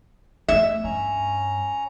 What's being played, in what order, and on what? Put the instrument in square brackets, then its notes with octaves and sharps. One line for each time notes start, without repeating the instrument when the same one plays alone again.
[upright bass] A3 C4 [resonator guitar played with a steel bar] E5
[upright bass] G2 [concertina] C#4 A#5